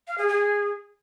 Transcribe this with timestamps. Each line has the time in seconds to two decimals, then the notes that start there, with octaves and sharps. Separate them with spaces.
0.08 F5
0.18 G#4
0.28 G#4